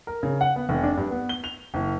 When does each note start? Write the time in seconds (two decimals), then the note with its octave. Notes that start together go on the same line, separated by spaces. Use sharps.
0.07 A#4
0.23 C#3
0.41 F#5
0.56 B3
0.69 F1
0.84 D4
0.97 G2
1.11 B3
1.29 G7
1.44 F7
1.74 F#1